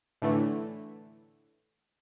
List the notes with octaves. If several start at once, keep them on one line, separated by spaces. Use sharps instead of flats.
A2 D3 E3 A3